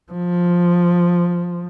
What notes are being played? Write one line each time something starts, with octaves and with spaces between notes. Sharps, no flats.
F3